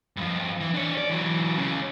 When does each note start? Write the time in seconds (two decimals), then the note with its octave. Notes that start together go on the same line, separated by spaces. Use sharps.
0.17 G2 F3
0.61 E3
0.74 D4 C#5
0.98 D5
1.10 E3 F#3
1.57 C#2 C#3